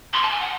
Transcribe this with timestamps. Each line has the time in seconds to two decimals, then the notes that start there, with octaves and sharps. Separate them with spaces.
0.13 C6
0.23 A5
0.31 G#5
0.41 F#5